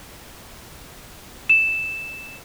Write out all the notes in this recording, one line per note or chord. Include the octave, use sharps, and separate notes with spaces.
E7